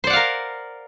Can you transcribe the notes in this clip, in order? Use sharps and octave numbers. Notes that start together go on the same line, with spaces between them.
A#4 C5 D5 F5 F#5